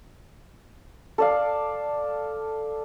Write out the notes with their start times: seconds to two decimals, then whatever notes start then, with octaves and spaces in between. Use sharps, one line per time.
1.18 A4 D5 F5